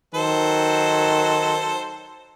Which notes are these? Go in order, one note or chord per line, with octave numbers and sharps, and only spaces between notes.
D#3 F#3 A4 C5